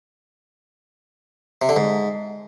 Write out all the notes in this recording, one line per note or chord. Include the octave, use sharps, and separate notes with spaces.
C3
D3
G#2